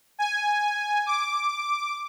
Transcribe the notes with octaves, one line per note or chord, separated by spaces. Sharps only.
G#5
D6